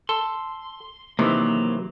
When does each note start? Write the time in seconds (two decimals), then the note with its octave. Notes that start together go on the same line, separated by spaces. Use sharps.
0.09 A4 C6
1.19 C3 D#3 E3 F#3 A#3